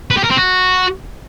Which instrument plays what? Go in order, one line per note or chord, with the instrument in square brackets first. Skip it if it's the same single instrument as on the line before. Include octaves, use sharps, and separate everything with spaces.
[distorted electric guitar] B4
G4
A#4
C4
F#4